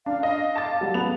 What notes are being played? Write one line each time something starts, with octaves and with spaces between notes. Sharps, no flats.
D4 F5
D#5 F5
A5 D6 A6
F#3 G3
B3 F7